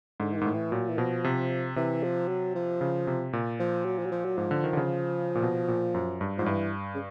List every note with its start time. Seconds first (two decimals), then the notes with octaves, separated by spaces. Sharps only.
0.20 G#2 D3
0.32 E3
0.37 G#2 D#3
0.46 A2
0.55 E3
0.72 A#2 F#3
0.89 E3
0.98 B2 F3
1.24 C3
1.76 C3 E3
2.03 F3
2.28 F#3
2.55 F3
2.81 C#3
3.07 C3
3.33 A#2
3.60 F3
3.85 F#3
3.99 F3
4.06 F#3
4.12 F3
4.25 F#3
4.38 G#2 F3
4.51 D3
4.64 D#3
4.73 D3
4.77 C#3
5.35 A#2
5.42 B2
5.68 A#2
5.94 F#2
6.21 G2
6.38 G#2 F3
6.46 G2 E3
6.94 C#3